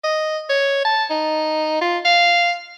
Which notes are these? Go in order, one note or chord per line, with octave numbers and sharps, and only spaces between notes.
D#5
C#5
A5
D#4
F4
F5